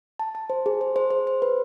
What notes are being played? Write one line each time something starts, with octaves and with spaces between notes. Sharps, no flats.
A5
A5
C5
G#4
C5
C5
C5
C5
B4